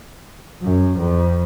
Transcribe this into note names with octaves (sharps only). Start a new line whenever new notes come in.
F#2
F2